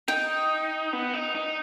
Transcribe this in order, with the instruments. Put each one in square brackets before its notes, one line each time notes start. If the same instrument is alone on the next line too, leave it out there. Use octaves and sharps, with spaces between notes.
[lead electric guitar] D#4 [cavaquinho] G5
[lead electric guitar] B3
D#4
D#4